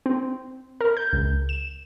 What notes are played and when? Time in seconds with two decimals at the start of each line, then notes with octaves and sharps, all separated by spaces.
0.06 C4
0.81 A#4
0.97 G6
1.13 C#2
1.49 E7